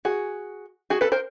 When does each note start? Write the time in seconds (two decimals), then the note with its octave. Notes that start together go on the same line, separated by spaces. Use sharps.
0.05 F#4 G#4
0.90 F#4 G#4
1.01 A4 B4
1.12 A#4 C5